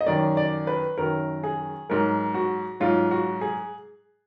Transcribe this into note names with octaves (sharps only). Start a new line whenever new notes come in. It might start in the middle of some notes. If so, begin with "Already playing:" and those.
D#5
F#2 D#3 F#3 D5
D5
B4
F#2 D#3 F#3 A#4
G#4
G#2 F#3 A#4
F#4
G#2 F#3 F4
F#4
G#4